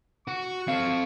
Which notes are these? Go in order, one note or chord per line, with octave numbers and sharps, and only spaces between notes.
F#4 C#6
C4 A4 F5